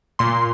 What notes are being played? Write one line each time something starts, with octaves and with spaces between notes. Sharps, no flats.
A#2 C6